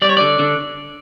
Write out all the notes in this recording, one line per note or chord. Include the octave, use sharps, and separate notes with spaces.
G3 D5
C#5
D3 D5
D3